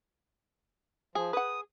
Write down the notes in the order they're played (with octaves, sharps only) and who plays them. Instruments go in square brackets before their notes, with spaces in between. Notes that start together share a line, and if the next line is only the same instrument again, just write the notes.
[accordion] F3 [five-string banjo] G#4
[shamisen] B4 F#5 [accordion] D#6